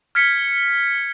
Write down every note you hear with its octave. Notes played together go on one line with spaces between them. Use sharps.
F6 G#6 B6 C#7